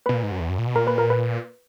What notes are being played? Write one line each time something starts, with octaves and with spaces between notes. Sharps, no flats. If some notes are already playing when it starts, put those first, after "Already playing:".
B2 B4 B5
A#2
G#2
F#2
E2
F#2
A#2
B2
A#2 A#4 A#5
B4 B5
A#4 A#5
B4 B5